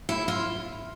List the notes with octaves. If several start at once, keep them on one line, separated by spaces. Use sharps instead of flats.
E4
F4